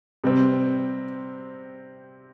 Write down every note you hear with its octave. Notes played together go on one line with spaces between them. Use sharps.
C3 G3 C4